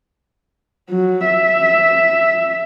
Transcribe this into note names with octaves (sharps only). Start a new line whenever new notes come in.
F#3
E5